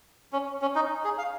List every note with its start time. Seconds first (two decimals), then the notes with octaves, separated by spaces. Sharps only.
0.33 C#4
0.62 C#4
0.75 D#4
1.04 G#4
1.18 F5